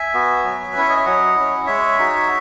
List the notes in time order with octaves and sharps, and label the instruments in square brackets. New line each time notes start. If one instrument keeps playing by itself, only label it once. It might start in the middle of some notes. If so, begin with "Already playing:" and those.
Already playing: [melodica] E5 G#5
B3 F#4
F#3
B4
C#4 E4 C#5
D#5
E5
F#3 D#5 F#5
C#4 E4
G#3 C#5 E5
D#4 F#4